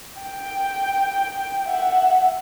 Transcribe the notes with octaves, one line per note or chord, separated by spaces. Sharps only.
G5
E5 F#5